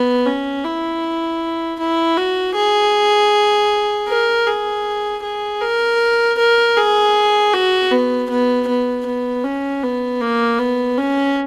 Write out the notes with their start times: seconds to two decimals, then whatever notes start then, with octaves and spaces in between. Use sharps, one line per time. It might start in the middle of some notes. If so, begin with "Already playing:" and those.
Already playing: B3
0.26 C#4
0.64 E4
1.79 E4
2.17 F#4
2.55 G#4
4.09 A#4
4.47 G#4
5.23 G#4
5.61 A#4
6.38 A#4
6.76 G#4
7.53 F#4
7.91 B3
8.30 B3
8.68 B3
9.06 B3
9.44 C#4
9.83 B3
10.21 A#3
10.59 B3
10.98 C#4